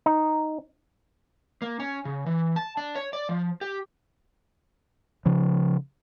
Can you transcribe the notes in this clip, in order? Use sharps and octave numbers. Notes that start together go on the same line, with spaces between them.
D#4
A#3
C#4
C#3
E3
A5
D4
C#5
D5
F3
G4
C#3 F3